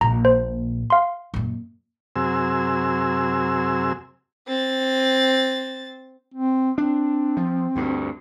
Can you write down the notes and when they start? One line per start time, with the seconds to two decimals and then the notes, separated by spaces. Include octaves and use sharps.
0.01 A#1 A#2 A#5
0.25 C5
0.90 F5 C6
1.34 F#2 A#2
2.16 F#2 C3 G#4 E6
4.47 C4 A6
6.34 C4
6.78 C4 D4
7.37 F3
7.76 D2 G2